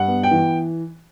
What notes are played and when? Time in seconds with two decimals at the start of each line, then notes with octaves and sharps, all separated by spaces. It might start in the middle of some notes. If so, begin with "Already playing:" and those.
Already playing: G2 F#5
0.08 B3
0.23 G5
0.31 E3